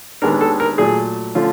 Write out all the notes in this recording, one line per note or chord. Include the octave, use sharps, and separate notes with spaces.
D#2 D#3 G#3 B3 D4 A#4
A4
A#4
A#2 F#3 A3 G#4
D3 F3 A3 C#4 F4